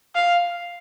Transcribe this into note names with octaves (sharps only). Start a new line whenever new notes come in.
F5